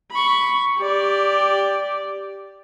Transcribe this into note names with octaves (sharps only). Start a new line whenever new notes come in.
B5 C#6
G4 D5